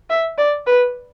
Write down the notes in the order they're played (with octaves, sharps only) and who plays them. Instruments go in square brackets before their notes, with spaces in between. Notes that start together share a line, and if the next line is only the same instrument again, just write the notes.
[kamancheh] E5
D5
B4